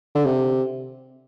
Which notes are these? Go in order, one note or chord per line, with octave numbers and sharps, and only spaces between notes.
D3
C3